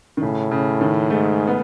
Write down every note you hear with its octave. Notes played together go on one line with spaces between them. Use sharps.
D#3
A2 C#3
C#3
D#3
G#2 A3
B3